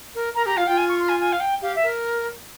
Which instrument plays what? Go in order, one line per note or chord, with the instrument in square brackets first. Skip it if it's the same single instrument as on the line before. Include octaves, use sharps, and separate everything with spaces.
[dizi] A#4
[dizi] A#4 [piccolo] A#5
[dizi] G4 [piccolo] A#5
[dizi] F4 [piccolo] F5
[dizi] F4 [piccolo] G5
[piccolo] G#5
C#6
C6
G#5
G#5
F5
G5
[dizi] G4 [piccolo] F5
[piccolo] E5
[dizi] A#4